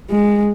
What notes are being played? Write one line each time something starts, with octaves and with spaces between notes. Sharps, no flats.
G#3